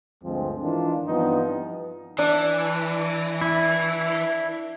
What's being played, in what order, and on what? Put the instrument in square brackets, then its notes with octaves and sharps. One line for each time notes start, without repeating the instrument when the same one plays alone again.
[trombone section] D2 G2 F3 G#3 C4
D#3 E3 D4 F4
G2 E3 F3 B3 C4 D#4
[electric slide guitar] E3 [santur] D4
[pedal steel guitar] E4